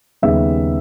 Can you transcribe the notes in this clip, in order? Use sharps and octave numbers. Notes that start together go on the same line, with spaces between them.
D#2 C#3 G3 B3 D#4 E5